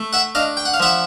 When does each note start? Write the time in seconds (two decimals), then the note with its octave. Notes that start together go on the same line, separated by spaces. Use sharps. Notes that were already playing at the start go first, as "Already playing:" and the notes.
Already playing: A3
0.13 E5 F#5
0.35 D4 D#5 F5
0.57 G5
0.65 F#5
0.74 F5
0.80 F3 E5 F#5